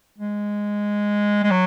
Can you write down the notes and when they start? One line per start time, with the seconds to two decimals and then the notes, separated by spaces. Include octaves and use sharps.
0.18 G#3
1.43 G#3
1.51 F#3